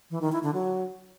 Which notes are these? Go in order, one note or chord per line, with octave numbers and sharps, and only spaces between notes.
E3
D#3
E4
D3
F#3